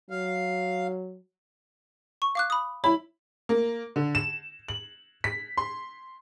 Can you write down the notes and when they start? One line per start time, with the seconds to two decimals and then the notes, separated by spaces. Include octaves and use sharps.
0.10 F#3 F5
2.22 C#6
2.35 F5 D6 F#6
2.50 B5 D#6
2.84 E4 C#5 B5
3.49 A#3
3.96 D3
4.15 E7
4.68 F#7
5.24 B6
5.58 C6